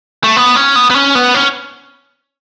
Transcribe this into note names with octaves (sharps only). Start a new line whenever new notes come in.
A3
B3
C#4
B3
B3
C#4
B3
C#4